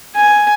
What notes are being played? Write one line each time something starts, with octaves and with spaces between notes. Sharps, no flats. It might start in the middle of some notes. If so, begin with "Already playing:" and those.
G#5